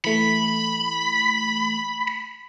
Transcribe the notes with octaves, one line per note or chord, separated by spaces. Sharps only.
E3 A3 B5